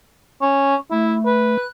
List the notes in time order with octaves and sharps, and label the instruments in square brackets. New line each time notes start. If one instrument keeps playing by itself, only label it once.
[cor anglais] C#4
[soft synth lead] A3 [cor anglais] E4
[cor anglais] B4
[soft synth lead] F#6